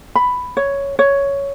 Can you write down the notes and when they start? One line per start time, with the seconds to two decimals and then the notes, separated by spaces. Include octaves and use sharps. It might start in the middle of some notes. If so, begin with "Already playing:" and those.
0.15 B5
0.57 C#5
0.99 C#5